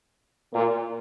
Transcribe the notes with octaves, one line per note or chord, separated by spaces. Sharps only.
A#2